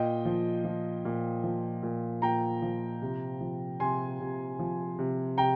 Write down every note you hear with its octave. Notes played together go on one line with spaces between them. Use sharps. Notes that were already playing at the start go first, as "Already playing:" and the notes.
Already playing: A#2 D#5 G5
F3
F3
A#2
F3
A#2
A#2 G5 A#5
F3
C3
F3
C3 G#5 C6
C3
F3
C3
C3 G5 A#5